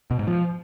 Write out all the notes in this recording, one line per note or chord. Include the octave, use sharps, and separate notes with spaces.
B2
G#2
F3